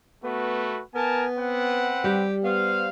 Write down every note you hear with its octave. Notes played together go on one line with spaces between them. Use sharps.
A3 B3 F#4 B4
B3 A#4 G#5 A5
C4 B4 F#5
G3 G4
B3 C5 F5